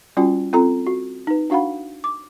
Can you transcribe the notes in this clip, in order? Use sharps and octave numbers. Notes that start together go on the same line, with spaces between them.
G3 C#4 F4 F#4 G5
C4 F4 A4 A#5
F#4
D#4 B4
D4 F#4 F5 F#5 B5
D6